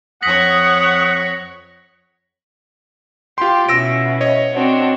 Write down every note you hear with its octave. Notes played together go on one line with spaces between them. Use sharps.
F2 C#5 F#5 D#6 A#6 B6 F#7
F4 G4 C6
B2 C#4 E4 E6 A#6 D7
C#5 D#5
C4 D4 F#4